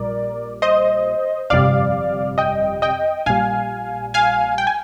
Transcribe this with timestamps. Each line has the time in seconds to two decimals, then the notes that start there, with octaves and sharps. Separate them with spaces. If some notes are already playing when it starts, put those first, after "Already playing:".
Already playing: A#1 A#2 G3 A#4 D5
0.62 C5 D#5
1.50 G1 F2 C3 G3 D5 F5
2.38 D#5 G5
2.82 D#5 G5
3.26 A#1 A#2 G3 F5 G#5
4.14 F5 G#5
4.58 G5
4.67 G#5